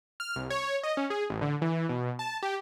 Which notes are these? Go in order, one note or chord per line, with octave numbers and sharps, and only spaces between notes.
F6
C2
C#5
D#5
C#4
G#4
A1
D3
E3
B2
A5
G4